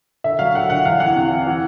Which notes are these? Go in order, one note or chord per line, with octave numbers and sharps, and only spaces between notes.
D3 E5
F#3 F5
D3 F#5
D3 F#5
E2 F5
E3 F#5
C3
E3
E3